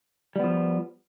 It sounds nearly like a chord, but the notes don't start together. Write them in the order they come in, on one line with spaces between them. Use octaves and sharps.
G3 B3 F3